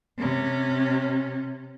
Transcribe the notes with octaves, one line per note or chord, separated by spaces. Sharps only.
C3 C#4